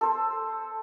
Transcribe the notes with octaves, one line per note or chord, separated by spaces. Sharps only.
A4 C5